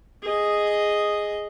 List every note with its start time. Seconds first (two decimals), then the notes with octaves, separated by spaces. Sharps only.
0.23 G#4 D#5